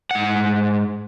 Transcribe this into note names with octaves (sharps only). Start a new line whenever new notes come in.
G#2 F#5